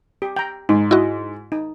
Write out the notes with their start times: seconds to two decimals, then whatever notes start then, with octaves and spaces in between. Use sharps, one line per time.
0.22 G4
0.36 G5 A#5
0.69 G#2 D#4
0.91 E4 F#4 D#5
1.52 D#4